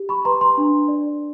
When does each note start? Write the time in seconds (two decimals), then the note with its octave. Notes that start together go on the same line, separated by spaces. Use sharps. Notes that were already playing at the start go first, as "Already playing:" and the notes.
Already playing: G4
0.09 B5 C#6
0.25 B4 A#5 C6
0.41 A#5 C6
0.58 D4
0.88 D5